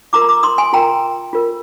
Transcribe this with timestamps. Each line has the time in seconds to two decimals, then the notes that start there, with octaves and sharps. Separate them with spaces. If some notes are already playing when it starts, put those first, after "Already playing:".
0.13 F4 A#4 A#5 D6
0.29 A#5 D6
0.43 C6 D#6
0.58 G#5 C6
0.73 F4 A#4 G5 A#5
1.33 F4 A#4